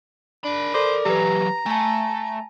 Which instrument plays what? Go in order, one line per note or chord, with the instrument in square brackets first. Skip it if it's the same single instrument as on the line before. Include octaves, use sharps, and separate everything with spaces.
[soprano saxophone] D4 [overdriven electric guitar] A#4 B5
[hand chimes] A4 D5 D6 [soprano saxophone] C5
[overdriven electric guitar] E3 F#3 [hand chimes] G4 B4 [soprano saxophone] A#5
[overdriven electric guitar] A3 [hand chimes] G#5 A5